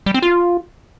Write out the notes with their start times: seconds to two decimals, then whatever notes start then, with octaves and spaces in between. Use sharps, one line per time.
0.06 G3
0.14 C4
0.22 F4